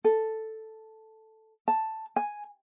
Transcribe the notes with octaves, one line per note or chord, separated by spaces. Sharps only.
A4
A5
G#5